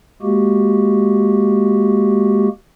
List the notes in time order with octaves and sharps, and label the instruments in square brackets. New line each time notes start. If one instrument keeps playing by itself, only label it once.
[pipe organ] G#3 A#3 F#4 G4